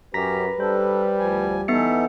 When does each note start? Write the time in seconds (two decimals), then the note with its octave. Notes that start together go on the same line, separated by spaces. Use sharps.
0.14 F#2 C#4 G4 B4 A#5 A#6 B6
0.60 G3 D4 A4 C5
1.19 D2 F3 G#5
1.68 E3 B3 D#4 A4 E5 C#7